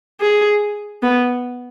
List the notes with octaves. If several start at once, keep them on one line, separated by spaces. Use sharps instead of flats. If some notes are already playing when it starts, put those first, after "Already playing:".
G#4
B3